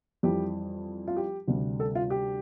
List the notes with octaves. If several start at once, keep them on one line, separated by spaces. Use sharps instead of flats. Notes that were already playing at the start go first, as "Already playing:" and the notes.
F2 E3 G3 G4
F4
G4
D2 C3 G3
A4
F4
G4